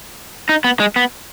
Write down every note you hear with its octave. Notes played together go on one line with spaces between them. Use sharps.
D#4
B3
G#3
B3